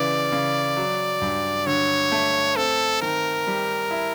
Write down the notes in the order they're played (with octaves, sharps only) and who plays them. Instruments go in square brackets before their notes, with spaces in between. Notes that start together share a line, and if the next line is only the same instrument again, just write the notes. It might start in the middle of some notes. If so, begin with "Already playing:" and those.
Already playing: [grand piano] C#3 E3 [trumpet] D5
[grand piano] C#3
F#3
G2
[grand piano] D3 [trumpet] C#5
[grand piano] A3
[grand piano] C4 [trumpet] A4
[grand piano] D#3 [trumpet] A#4
[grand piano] G3
E4